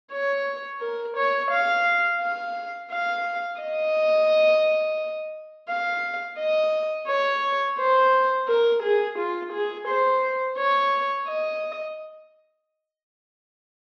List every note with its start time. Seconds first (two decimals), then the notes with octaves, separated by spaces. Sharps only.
0.12 C#5
0.81 A#4
1.17 C#5
1.52 F5
2.21 F5
2.91 F5
3.61 D#5
5.69 F5
6.39 D#5
7.09 C#5
7.79 C5
8.48 A#4
8.83 G#4
9.19 F4
9.53 G#4
9.88 C5
10.58 C#5
11.28 D#5